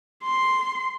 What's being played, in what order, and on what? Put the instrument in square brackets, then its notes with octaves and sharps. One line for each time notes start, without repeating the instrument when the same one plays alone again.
[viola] C6